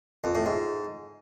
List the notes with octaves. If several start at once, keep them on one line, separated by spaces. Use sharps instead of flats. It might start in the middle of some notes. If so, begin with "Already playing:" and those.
F2
A2
G#2